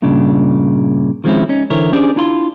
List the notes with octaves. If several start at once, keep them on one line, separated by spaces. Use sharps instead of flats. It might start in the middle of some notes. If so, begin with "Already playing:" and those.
G2 A#2 C#3 D4
D#3 F3 G#3 C4 C#4 E4
C#4 D#4
D3 E3 E4 A#4 C5 C#5
C#4 D4 G4 G#4 C5 D5
D4 E4 F4 B5 C6